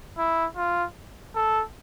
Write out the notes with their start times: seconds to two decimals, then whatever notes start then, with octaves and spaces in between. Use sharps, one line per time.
0.18 E4
0.57 F4
1.35 A4